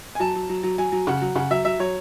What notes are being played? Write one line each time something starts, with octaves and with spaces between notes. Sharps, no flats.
G#5
F#3 A5
F#3
F#3
F#3
F#3 G#5
F#3
C#3 F#5
F#3
C#3 F#5
F#3 E5
F#3 E5
F#3 C#5